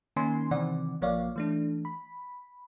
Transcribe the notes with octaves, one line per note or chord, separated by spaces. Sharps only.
D#3 A#3 C#4 D#4 G#5 C6
C3 D#3 E3 C4 D5 F#5
A#1 F3 A#3 C#5 D5 F5
E3 A3 D4
B5